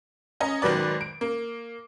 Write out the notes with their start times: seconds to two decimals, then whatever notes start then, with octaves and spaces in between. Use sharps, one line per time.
0.40 C#4 D#5 A#5
0.62 G#1 D#3 F#3 B4 D5
1.01 D7
1.21 A#3